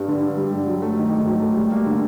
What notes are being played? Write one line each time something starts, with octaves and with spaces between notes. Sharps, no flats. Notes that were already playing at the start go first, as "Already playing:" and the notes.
Already playing: G2 G3
D3
G2
G3
G2
F#3
A3
D#3
G#2
F#3
A3
G3
A#3
D3